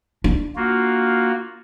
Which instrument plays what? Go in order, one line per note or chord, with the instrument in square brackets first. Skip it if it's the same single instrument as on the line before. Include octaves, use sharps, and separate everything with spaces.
[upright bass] D4
[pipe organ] A#3 F4 F#4